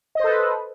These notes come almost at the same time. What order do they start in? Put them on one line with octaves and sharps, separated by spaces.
D#5 C5 A4 B4